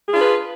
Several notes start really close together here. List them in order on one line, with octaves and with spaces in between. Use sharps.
G#4 F4 D4 B4